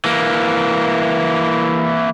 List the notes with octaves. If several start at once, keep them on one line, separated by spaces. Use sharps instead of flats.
E3 A#3